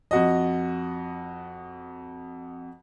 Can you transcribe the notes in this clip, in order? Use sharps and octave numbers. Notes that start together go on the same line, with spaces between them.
F2 F#4 D#5